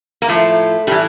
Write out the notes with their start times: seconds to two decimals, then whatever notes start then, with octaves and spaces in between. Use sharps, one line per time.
0.22 A#3
0.28 A2 F3 A3
0.87 A2 G3
0.91 E3